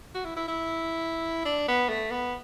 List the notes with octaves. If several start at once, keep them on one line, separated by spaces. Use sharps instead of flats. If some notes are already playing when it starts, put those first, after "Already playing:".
F#4
E4
E4
E4
D4
B3
A3
B3